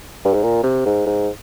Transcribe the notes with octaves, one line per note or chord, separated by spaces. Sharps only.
G2
G#2
A#2
C3
G#2
G#2